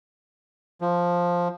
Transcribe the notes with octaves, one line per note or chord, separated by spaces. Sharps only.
F3